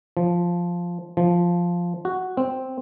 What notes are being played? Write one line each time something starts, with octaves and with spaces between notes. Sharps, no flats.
F3
F3
F#4
C4